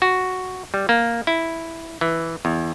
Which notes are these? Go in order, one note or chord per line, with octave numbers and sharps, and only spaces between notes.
F#4
G3
A#3
E4
E3
E2